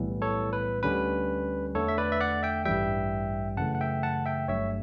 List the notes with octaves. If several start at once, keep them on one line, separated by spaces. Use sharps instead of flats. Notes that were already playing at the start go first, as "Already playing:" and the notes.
Already playing: B1 A2 E3 G3 B3
A4 C#5
B4
D2 D3 G3 C#4 B4
E2 D3 A3 A4 C#5
E5
B4 D5
E5
D5 F#5
E5 G5
A1 G2 E3 G3 E5 G5
F#2 C#3 E3 A3 F#5 A5
F#5
E5 G5
F#5 A5
E5 G5
G1 G2 F#3 A3 C#5 E5